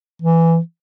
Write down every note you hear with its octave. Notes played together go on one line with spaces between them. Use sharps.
E3